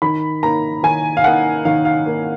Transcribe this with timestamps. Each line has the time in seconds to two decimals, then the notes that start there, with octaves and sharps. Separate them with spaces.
0.02 D#3 B5
0.43 A#3 D#4 A#5
0.83 D#3 G#5
1.17 F5
1.24 A#3 D#4 F#5
1.65 D#3 F5
1.85 F5
2.06 A#3 D#4